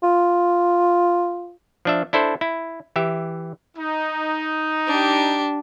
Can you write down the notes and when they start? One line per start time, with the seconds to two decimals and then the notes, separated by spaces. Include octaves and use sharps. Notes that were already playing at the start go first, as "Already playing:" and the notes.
0.03 F4
1.85 F3 D4 E5
2.13 D4 E4 A4 C5
2.41 E4
2.96 E3 G4 E5
3.76 D#4
4.87 D4 G4